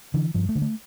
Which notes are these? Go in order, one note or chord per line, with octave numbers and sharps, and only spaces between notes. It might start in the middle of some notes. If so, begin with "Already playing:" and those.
D3 E3
G2 F3
A3
D3
A3